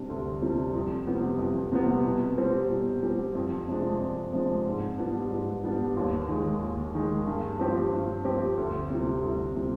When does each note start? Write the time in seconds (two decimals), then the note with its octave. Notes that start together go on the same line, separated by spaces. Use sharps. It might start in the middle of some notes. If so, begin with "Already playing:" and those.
Already playing: C3 G3 D4
0.09 D2
0.42 C3 G3 D4
0.74 F2
1.07 C3 G3 B3
1.39 F2
1.72 C3 G3 B3
2.05 B2
2.38 G3 C4
2.70 B2
3.03 G3 C4
3.35 F2
3.68 C3 F3 G#3 D4
4.00 F2
4.33 C3 F3 G#3 D4
4.66 G#2
4.98 G3 B3 D4
5.31 G#2
5.64 G3 B3 D4
5.97 D#2
6.28 D#3 G#3
6.62 D#2
6.95 D#3 G#3
7.27 G2
7.59 F3 C4 G4
7.93 G2
8.25 F3 C4 G4
8.57 D2
8.90 C3 G3
9.23 D2
9.56 C3 G3